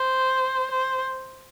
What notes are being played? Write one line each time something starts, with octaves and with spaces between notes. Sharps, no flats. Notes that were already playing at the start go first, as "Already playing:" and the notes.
Already playing: C5
C5